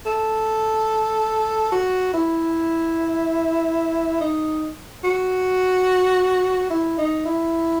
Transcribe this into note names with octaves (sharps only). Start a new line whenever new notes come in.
A4
F#4
E4
D#4
F#4
E4
D#4
E4